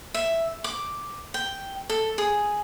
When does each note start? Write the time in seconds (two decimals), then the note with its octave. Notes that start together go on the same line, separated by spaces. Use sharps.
0.14 E5
0.64 D6
1.34 G5
1.90 A4
2.18 G#4